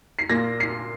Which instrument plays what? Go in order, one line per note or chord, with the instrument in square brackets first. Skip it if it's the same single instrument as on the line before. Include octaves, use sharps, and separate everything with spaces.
[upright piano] C7
[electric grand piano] A#2 A#3 F4 [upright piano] A#6
[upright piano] C7